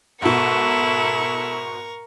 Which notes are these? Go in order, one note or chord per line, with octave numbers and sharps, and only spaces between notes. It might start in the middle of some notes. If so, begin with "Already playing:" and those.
G#2 B2 E4 A4 A#4 C#6